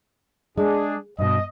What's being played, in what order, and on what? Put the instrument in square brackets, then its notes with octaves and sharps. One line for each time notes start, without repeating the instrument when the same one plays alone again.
[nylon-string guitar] G#3 [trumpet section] D4 G#4
[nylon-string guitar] G2 B2 [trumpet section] D#5